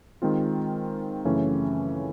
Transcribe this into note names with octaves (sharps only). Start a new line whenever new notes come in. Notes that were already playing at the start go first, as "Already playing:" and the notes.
D#3 G#3 C4 F4
F#2 C#3 E3 A3 C#4